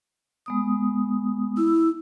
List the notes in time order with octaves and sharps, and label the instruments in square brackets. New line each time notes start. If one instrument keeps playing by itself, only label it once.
[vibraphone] G#3 B3 D#6
[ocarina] E4 [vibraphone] E6